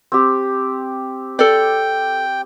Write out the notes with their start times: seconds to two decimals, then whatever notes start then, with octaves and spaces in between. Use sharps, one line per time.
0.12 C4 G4
1.39 A4 D5 G5